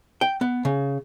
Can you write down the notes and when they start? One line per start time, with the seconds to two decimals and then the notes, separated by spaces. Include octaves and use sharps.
0.21 G5
0.41 B3
0.65 C#3